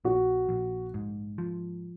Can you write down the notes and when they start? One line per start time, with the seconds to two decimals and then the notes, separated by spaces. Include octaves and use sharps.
0.05 A#1 F#4
0.49 A#1
0.94 G#2
1.38 F3